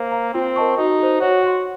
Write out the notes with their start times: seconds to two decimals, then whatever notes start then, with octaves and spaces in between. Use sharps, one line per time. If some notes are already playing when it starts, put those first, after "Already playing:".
Already playing: A#3 C5
0.12 F5 A#5
0.34 C4 F4
0.56 A#4 D#5 A5 C#6
0.78 D#4 F#4
0.99 A4 C5
1.21 F#4 C#5
1.43 F#5 C6